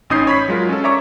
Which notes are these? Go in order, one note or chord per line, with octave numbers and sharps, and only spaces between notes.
A1 C#4 D#4 D#6 G6 C7
C#5 B5 B6
F#3 G#3 F4 A#4
C#4 A4
C#5 D5 E5 A#5 C#6 D6